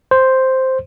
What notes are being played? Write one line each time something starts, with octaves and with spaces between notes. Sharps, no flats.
C5